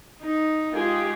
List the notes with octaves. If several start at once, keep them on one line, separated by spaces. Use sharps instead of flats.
D#4
G#3 F4 G4 G#4